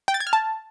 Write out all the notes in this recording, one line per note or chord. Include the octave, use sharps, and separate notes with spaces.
G5
A6
G#6
F6
A5